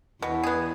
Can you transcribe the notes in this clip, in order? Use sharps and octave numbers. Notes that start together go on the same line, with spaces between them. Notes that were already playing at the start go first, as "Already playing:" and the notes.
E2 B2 E3
B3 G#4